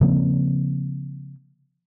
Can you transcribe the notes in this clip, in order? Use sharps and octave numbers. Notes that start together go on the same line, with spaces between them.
C#3 F3 A#3 C4